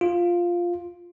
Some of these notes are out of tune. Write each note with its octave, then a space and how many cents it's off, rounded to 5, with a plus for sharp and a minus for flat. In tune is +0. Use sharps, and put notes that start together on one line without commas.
F4 +0